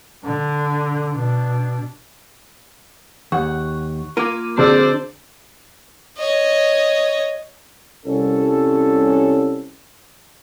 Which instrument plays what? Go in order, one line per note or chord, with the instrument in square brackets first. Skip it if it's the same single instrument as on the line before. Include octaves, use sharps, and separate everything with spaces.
[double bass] D3
B2 D4
[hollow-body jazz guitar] D#2 [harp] F#5 [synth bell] C#6
[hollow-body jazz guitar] A#3 F4 A#4 [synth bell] D6 D#7
[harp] D3 [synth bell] C4 G#4 E6 [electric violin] C5 D5
[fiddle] C#5 D#5
[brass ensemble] C2 C#4 A4